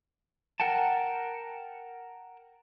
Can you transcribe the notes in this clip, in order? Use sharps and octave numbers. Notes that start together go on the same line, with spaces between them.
A#4 F#5 G5 A5